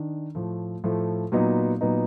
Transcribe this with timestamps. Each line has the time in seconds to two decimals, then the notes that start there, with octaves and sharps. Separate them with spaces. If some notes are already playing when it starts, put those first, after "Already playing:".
Already playing: D#3 D4
0.35 A2 F3 A3
0.84 A2 F3 A3
1.32 A#2 F#3 B3 D#4
1.81 A#2 F#3 B3 D#4